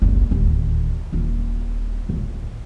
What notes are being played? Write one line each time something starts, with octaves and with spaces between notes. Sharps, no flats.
F#1 C2
D1 D#2
D#1 F4
D1 A#1